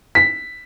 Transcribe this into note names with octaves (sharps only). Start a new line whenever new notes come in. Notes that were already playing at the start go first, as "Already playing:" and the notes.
B6